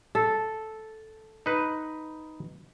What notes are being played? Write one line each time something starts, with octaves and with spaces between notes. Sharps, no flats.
A4
D#4 B4